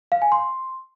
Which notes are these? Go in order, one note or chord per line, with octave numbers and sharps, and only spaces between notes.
F5
G#5
C6